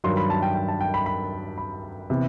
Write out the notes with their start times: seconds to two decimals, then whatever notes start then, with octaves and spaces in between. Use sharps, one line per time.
0.04 G2 D#3 F#3 C6
0.17 B5
0.30 A5
0.42 G5
0.55 G5
0.68 A5
0.81 G5
0.94 B5
1.06 B5
1.58 B5
2.10 C3 E3 B3